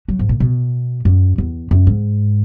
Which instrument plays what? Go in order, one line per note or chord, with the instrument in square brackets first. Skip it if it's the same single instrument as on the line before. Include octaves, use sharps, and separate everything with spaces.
[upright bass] F#3
G#2
A#2
B2
F#2
E2
F#2
G#2